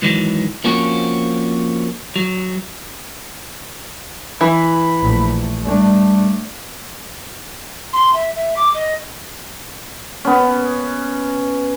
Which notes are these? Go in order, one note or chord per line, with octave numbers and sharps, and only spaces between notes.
G#2 D#3 E3 F#3
F3 A#3 C4 C#4 F#4
F#3
E3 B5
A#1 A3
G3 A3 D4
C6
E5
E5
D6
D#5
B3 C#4